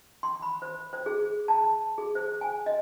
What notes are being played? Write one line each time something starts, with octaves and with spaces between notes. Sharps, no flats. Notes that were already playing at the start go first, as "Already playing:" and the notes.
C6
B5
C5
C5
G#4
A5
G#4
C5
G#5
D#5